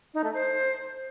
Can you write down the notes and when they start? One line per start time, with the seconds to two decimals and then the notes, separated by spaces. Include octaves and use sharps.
0.14 D#4
0.24 A3
0.34 C5